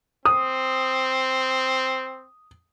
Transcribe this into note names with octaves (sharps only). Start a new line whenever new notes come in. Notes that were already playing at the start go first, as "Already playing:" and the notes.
C4 D#6